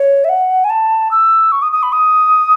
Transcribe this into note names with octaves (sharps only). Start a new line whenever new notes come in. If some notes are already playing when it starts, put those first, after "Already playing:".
Already playing: C#5
E5
F#5
G#5
A5
E6
C#6
D#6
D#6
B5
D#6